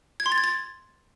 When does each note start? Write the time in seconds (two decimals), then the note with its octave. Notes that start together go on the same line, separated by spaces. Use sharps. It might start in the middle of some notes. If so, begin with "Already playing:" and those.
0.20 G#6
0.26 C6
0.32 A6
0.38 G#6
0.44 A6